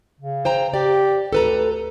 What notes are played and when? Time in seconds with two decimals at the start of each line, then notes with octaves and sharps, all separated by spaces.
0.20 C#3
0.45 C5 G5 A#5
0.74 G4 D5
1.33 D2 A4 B4 A#5